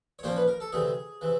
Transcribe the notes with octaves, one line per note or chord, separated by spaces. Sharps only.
C#5
A#2 F3 A#3 C#4 C5
B4
A#4
A4
D2 C3 E3 G#4
C3 E3